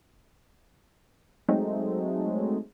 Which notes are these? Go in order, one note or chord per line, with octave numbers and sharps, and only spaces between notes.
F#3 G#3 A3 C4 D#4